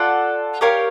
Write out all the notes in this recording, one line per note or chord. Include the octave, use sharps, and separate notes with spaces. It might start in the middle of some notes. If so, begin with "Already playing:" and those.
Already playing: F4 A4 D5 F#5
G4 A#4 C#5 F5